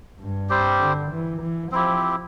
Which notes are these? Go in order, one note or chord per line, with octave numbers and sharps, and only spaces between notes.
G2
G3 C4 G4 C5
D3
E3
E3
F3 C4 E4 G4